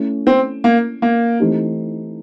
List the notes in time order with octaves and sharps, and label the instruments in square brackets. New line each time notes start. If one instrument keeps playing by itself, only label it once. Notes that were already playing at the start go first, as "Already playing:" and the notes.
Already playing: [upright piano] A3 C#4 E4
[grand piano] C4
A#3
A#3
[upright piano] E3 A3 C4 D#4 G4